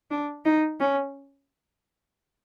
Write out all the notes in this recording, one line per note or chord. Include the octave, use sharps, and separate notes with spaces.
D4
D#4
C#4